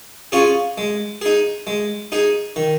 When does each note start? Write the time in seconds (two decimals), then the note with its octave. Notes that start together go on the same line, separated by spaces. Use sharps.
0.32 C#4 F4 G#4
0.78 G#3
1.22 D#4 G#4
1.67 G#3
2.12 D#4 G#4
2.56 D#3